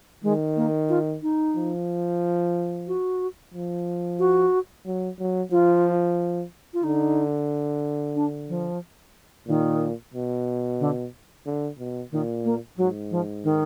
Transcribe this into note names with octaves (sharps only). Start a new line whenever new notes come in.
D#3 G#3
A#3
F4
D#4
F3
F#4
F3
F#4
F#3
F#3
F3 F4
F4
D3 D#4
D4
F3
A#2 D#3
B2
D3
D3
B2
A#2 D#3
A#3
G#2 F#3
F3
D#3